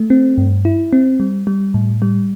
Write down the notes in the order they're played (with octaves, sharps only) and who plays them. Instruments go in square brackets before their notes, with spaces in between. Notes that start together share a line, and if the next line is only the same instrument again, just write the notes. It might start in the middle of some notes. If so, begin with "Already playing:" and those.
Already playing: [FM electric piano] A3
C4
G2
E4
C4
G3
G3
A2
G3